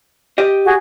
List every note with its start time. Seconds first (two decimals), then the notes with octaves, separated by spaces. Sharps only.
0.38 G4 D#5
0.64 F#4 G#4